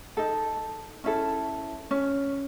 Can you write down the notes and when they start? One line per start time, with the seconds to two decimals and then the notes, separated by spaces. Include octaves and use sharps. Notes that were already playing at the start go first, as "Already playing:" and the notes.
0.17 D#4 A4
1.04 C#4 E4 A4
1.91 C#4